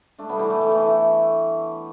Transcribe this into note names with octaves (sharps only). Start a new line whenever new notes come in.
A3 D4
G3 B3
E3 A3
E3 A3
E3 A3
E3 A3
E3